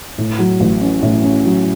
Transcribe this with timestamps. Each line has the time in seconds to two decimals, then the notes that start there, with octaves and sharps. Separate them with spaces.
0.18 A2
0.39 F#3
0.60 A1
0.81 C#4
1.02 A2
1.23 C#4
1.45 F#3